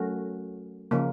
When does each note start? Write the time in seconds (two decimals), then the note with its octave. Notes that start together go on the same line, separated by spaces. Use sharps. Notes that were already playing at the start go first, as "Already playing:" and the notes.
Already playing: F#3 A3 C#4 F#4 A#4
0.91 C#3 F3 A#3